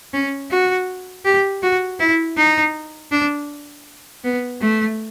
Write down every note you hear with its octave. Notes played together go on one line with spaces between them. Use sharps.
C#4
F#4
G4
F#4
E4
D#4
D4
B3
A3